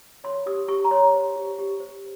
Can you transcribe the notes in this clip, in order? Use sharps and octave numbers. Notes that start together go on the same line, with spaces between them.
C#5 C6
G4 D#6
G4 C#6
A#5
C#5 C6
C5
G4
G4
C5